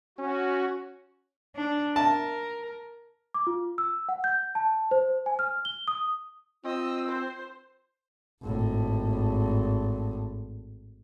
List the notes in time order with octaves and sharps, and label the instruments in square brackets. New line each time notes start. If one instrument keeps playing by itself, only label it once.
[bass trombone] C#4 [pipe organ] F#4
[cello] D4
[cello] A#4 [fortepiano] A5
[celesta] D6
F4
E6
F#5
G6
A5
C5
G#5
F6
G7
D#6
[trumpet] C4 [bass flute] F4 [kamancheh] D#5 E6
[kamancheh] C5
[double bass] G#1 A2